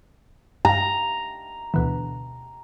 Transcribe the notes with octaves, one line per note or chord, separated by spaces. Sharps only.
G2 A#5
D2 B2 E3